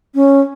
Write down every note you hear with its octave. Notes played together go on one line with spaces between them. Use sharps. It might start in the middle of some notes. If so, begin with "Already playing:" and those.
C#4